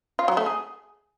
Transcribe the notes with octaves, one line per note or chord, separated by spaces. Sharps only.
F4
F#3
A3
G#4